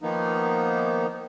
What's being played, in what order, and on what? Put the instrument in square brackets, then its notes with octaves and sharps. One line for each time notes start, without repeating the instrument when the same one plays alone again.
[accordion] D#3 F3 A#3 B3 D#4